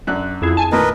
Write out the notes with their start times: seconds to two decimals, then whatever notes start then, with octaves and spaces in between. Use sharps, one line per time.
0.07 F#2 D4 F#6
0.42 F2 E4 G#4
0.57 G#5 A5
0.72 A#2 D#3 A3 A#4 B4 D#5